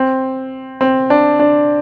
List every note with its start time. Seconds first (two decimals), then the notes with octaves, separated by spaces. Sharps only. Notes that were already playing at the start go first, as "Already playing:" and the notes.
Already playing: C4
0.81 C4
1.10 D4
1.39 D4